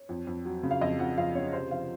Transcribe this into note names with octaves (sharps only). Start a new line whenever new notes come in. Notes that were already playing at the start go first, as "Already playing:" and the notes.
Already playing: C#5
F2
F2
F#3
C#3
F5
F2 D#5
F2 F#5
F2 F5
C#3 C#5
C3 C5
F3 F5